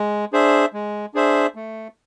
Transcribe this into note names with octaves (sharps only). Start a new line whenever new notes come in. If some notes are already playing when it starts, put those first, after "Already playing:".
Already playing: G#3
D4 G#4 C5 E5
G#3
D4 G#4 C5 E5
A3